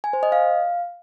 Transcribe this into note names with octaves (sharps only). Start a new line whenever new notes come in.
G#5
C5
D#5
F5